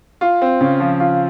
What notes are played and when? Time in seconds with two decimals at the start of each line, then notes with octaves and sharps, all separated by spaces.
0.21 F4
0.42 C4
0.61 C#3
0.80 F3
1.00 F4